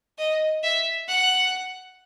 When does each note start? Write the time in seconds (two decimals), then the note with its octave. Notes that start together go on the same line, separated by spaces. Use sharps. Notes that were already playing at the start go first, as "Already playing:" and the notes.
0.18 D#5
0.63 E5
1.08 F#5